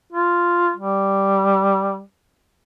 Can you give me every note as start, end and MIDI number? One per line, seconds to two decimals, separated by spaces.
0.12 0.71 65
0.76 2.02 55